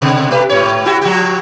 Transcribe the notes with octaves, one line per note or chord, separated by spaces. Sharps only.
B2 D3
A3 G4 B4
G#2 C#5
E4 F#4 G4
F3 F#4 G4